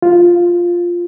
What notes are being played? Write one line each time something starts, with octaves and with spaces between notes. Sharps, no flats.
F4